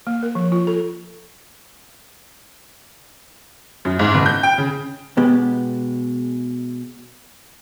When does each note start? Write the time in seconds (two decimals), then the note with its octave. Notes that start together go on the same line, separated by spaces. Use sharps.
0.07 A#3
0.23 A#4
0.35 F3
0.52 F4
0.67 A4
3.85 F#2
3.99 G#2
4.14 F#1
4.26 G6
4.43 G5
4.58 C#3
5.17 B2 G#3 B3 G4